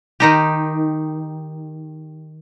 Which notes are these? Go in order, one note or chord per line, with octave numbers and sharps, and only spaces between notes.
D#3 D#4 G4